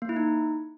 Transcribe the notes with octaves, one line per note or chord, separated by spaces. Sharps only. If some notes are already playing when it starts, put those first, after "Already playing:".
A#3
E4
D#4